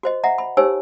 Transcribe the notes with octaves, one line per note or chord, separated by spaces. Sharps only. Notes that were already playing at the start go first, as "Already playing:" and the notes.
F#4 C5 D#5
D#5 E5 F#5 A#5
B5
D#4 G4 C5 C#5 G#5 E6